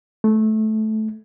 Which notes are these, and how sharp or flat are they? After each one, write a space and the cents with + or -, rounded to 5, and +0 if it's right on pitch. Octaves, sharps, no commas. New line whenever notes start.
A3 -15